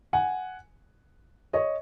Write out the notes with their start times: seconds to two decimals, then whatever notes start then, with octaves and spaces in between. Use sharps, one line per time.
0.13 F#5 G#5
1.53 C#5 D#5